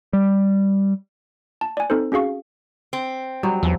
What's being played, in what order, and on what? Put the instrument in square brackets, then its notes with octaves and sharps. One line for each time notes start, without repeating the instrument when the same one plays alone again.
[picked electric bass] G3
[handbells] A5
D5 G#5
C4 D#4 A4 C5
C#4 F#4 G#4 F5 C#6
[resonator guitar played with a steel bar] C4
[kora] F#3 [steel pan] G3
[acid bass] E2 [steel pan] F3